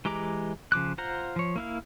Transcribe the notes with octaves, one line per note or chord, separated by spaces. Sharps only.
E3 G#3 G4 A#5 D6
C#3 F3 D6 F#6
F4 C5 F#5 A#5
F3 C#5
A#3 E4 F5